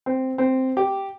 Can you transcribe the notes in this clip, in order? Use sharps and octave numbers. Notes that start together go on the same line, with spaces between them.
C4
C4
G4